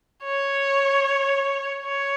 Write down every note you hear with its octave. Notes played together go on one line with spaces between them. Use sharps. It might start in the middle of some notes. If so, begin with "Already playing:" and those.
C#5
C#5